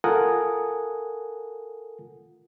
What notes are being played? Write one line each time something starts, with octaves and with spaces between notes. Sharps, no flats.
F4 A4 A#4 F#5 G#5 D#6